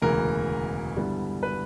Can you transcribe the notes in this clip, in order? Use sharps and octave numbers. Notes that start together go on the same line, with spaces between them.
E1 D2 C#3 E3 A#4
G2 D3 G3 B3 E4
B4